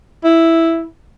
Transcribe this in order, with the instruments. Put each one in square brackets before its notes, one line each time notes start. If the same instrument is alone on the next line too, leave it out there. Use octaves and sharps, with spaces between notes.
[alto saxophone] E4